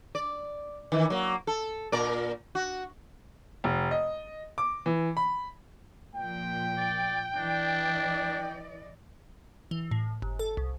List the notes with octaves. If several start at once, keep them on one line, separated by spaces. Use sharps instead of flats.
D5
D#3 E3
F#3 A#3
A4
A#2 A#4 D5
F#4
F1
D#5
D6
E3
B5
A#2 F3 G5
D5
E3 D4 D5 D#5
E3
A2
G1
A4
C2